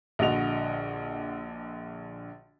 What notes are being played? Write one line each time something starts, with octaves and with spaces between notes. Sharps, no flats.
A#1 D3 F#4 D#5 F7